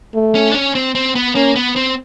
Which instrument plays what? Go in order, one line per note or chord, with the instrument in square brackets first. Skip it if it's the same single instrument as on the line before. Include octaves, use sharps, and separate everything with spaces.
[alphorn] A3
[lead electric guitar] C#4
D4
C#4
C4
C4
B3
[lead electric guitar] A#3 [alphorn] C#4
[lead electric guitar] B3
C4